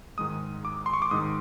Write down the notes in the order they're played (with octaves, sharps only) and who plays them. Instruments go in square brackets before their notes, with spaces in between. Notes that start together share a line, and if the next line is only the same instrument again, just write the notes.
[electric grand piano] G#2 D#3 G#3 D#6
D6
C6
C#6
D6
G#2 D#3 G#3 D#6